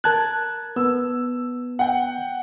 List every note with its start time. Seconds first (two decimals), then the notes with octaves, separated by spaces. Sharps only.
0.04 A#4 A5 F#6 G#6
0.76 B3 E6
1.79 F#5 G5